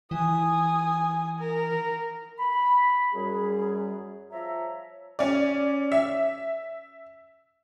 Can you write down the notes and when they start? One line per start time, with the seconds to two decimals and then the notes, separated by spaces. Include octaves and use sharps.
0.11 E3 G#5 D#6
1.39 A#4
2.39 B5
3.14 F#2 G3 G#4
4.30 F3 C#5 E5 A#5
5.19 C#4 D5
5.92 E5